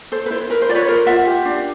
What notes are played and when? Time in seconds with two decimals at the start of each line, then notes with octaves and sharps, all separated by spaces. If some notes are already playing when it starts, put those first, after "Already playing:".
0.12 A4 C5
0.26 B4
0.31 E4 C5
0.50 A#4 B4
0.62 C5
0.69 F4 D5
0.75 B4 C#5
0.88 A#4 C5
1.06 F4 E5 F#5
1.27 G4
1.45 D4